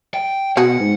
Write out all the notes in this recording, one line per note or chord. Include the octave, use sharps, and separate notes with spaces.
G5
B2 F#4 G#4 F#5
G#2